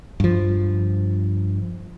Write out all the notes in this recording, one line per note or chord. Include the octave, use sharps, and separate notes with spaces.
G2 F3